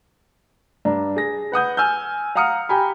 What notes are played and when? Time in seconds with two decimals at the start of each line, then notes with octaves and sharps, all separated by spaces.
0.85 G2 D4 A#5
1.16 G#4 A#6
1.52 B4 F#5 D#6 G6
1.77 G#5 E6 F6 G6
2.36 F5 F#5 A#5 D#6 F6 C#7
2.69 G4 G5 G#5 A#5 B5